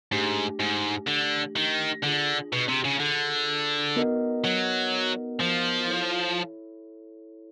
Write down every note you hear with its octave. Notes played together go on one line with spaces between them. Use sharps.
G#2 A3 D4 G4
G#2
D3
D#3
D3 D4 F4 G#4
B2
C3
C#3
D3
B3 D#4 F#4 A#4 D#5
F#3
F3
E4 A4 C#5